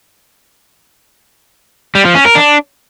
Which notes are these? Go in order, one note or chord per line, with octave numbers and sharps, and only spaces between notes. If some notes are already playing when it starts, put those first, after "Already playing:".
G3
F3
C#4
A#4
D4